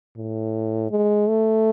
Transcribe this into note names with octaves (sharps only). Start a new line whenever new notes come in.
A2
G#3
A3